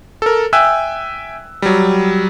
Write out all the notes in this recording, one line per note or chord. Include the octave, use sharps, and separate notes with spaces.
A4 A#4
E5 G5 G#5 E6 F#6
F#3 G3